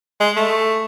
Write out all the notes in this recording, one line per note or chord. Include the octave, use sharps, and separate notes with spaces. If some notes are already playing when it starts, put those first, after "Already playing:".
G#3
A3